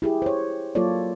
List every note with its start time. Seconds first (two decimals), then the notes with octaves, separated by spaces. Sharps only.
0.02 E4 G4 G#4
0.22 C5 C#5
0.75 F#3 A#3 F4 A4 C#5 D5